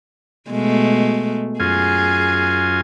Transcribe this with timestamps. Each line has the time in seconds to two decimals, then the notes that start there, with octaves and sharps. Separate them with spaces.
0.50 B2 G#3 A3
1.60 F#2 F4 G#4 G#5